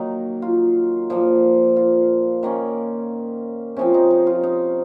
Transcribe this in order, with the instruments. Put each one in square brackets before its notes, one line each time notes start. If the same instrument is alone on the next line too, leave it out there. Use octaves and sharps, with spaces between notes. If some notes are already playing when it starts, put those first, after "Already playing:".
Already playing: [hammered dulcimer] D#3 F#3 A#3 D#4
F4
A#2 F3 A#3
F4
D#3 A#3 C#4
C3 F3 C4 C#4
D#4
D#4
F4
D#4